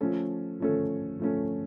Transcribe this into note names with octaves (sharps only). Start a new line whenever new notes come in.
F3 A3 C#4 A4
F3 A3 C#4 A4
F3 A3 C#4 A4